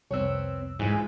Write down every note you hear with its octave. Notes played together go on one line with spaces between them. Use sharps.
C2 F2 C4 B4 C#5 E6
G#2 E3 G#3 F4